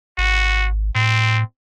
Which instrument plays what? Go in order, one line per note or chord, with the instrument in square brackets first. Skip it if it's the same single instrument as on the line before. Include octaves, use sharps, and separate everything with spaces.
[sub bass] G#1 [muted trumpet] F#4
[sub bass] A2 [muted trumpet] C4